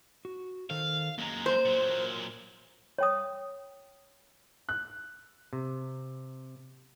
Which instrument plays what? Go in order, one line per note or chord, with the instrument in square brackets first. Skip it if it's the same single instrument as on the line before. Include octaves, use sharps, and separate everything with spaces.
[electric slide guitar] F#4
[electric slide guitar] D#3 A4 C5 [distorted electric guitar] F5
[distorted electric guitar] F#2 G#3 [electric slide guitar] A#3 A#5
[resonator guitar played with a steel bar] C5
[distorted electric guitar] A#2 F#3
[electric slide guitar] A#4
[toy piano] C#5 G5 D#6
[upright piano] F#6
[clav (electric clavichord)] C3